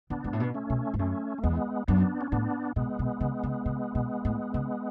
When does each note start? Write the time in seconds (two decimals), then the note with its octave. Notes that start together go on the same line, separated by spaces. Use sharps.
0.10 D3 B3 D4
0.24 G#2
0.33 A2
0.40 B2
0.54 A3 C#4
0.70 B2
0.94 G#2
0.99 F#2 A3 C#4
1.38 A3
1.43 E2 G#3 B3
1.88 F#2 B3 D4
2.21 C#4
2.32 A2 B3 D4
2.76 B2 G#3 B3
2.99 B2
3.20 C#3
3.43 C#3
3.66 C#3
3.95 B2
4.25 A2
4.54 C#3